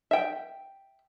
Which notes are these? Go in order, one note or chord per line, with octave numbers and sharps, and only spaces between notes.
E5 G5